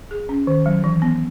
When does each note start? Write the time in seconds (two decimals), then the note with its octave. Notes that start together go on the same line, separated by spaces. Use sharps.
0.11 G#4
0.29 C#4
0.47 D#3
0.66 F#3
0.84 E3
1.02 B3